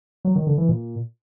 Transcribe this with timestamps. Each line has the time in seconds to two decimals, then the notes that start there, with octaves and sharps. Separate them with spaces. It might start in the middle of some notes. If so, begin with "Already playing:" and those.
0.25 F#3
0.36 D#3
0.47 D3
0.58 E3
0.69 A#2